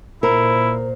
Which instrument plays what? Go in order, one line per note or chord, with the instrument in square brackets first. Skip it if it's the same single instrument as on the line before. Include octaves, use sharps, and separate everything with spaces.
[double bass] A#2 [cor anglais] E4 [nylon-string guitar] A#4 [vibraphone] C5